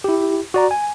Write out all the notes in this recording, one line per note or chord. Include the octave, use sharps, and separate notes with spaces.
E4 G4
F#4 D5 A#5
G#5